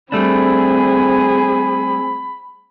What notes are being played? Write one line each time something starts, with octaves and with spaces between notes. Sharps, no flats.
G3 A3 C4 D4 G#4 B5